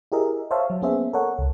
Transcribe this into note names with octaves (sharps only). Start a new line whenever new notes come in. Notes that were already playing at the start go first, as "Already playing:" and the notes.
E4 G4 G#4 A#4 D#5 E5
C5 C#5 E5 F5 A5
F#3
A#3 B3 C#4 G#4 C5 E5
A4 A#4 C#5 F#5
C#2